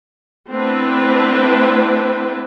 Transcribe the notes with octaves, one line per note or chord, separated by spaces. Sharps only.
A3 B3 C4 D4 E4 B4